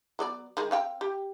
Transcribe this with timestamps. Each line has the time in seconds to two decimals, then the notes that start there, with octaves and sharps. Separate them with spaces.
0.19 F#3 B3 D5
0.57 D#3 G#3
0.71 C4 F5 G5
1.01 G4